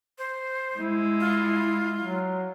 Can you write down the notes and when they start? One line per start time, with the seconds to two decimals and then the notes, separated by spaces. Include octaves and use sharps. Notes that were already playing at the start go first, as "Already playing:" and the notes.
0.18 C5
0.77 G#3 E4
1.20 F4
2.00 F#3